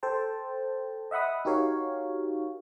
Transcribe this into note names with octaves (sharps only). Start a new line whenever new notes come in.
A4 C5 G5 A5
D#5 E5 F#5 B5 D#6
D#4 F#4 G4 A#4 C#5 F5